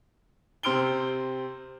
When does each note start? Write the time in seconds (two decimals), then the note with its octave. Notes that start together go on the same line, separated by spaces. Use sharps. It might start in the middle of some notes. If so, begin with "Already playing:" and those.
0.63 C3 C4 C6 F6 D7 G7